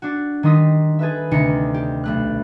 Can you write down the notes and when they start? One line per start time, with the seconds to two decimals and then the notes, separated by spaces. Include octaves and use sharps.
0.02 D4 F#4
0.43 D#3 G3 D#4 C6 D#6 B6
0.99 G#4 A4 B4 E5
1.31 D2 C3 D4 D#4 C#7
1.74 G4
2.04 B1 A3 F#6